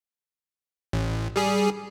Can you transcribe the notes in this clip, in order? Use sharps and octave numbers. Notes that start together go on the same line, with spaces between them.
A1
G3 G#4